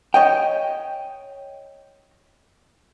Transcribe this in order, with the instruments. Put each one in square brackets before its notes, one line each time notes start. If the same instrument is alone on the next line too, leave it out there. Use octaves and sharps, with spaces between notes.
[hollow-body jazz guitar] C#5 D#5 G5